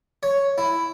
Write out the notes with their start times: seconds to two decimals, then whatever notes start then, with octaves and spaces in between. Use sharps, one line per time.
0.23 C#5
0.58 E4